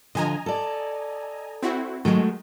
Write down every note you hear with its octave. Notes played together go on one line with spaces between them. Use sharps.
D3 F3 D#5 G#5 A#5
A4 D5
C4 E4 F#4
D#3 F#3 G#3 A3